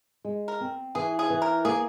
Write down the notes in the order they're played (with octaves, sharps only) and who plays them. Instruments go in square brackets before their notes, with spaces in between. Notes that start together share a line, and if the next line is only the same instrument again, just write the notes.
[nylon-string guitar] G#3
[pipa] A#4
[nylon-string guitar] C4
[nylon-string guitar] E3 [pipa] G#4
[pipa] G#4
[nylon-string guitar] E3
[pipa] A#4
[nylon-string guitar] A#3 [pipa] G#4